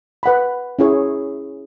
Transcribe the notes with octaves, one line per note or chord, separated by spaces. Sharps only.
B4 F#5 B5
C#4 E4 G#4 C#5